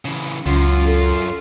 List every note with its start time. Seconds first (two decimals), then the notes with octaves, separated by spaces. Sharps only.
0.05 C#3 E3
0.46 C#2 F#2 C#4 F4
0.85 A4